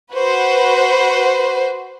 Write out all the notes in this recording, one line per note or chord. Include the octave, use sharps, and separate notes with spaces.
F#4 B4 C5